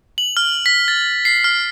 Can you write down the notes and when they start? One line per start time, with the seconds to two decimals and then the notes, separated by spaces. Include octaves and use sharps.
0.18 F#7
0.37 F6
0.66 B6
0.88 A6
1.25 C7
1.44 F6